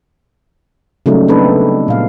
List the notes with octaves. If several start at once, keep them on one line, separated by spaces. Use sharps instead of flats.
C#3 F#3 G3 A3 A#3 D#4
B3 C4 D4 D#4 A4 B4
A#2 F5